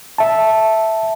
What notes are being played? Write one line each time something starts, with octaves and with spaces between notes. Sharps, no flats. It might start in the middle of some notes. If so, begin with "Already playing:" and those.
E5 A5